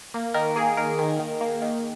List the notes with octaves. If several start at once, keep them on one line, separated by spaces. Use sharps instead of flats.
A#3
D#3 A#4
A#3 G#4
D#3 A#4
D#3
D#3
A#3
D#3